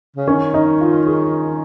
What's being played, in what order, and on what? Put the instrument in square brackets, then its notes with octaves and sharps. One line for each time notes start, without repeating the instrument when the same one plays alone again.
[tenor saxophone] C#3
[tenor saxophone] D#3 [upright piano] C#4
[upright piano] D#4
F4
G#4